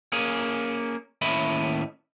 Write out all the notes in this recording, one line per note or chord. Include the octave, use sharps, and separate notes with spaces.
A#3 C#4 G#4
D#2 A2 C#4 D#5 E5 B5